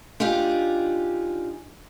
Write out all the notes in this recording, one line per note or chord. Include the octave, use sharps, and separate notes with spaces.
D4 D#4 F4 G4 G#4